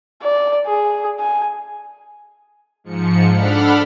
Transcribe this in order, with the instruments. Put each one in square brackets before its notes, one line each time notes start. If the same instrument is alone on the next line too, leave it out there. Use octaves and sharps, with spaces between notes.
[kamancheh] D5
G#4
G#5
[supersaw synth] G#2 F3 C#7
D4 A4 F#5 B5 F6